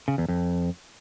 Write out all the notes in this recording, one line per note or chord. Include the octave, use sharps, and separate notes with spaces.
C#3
E2
F2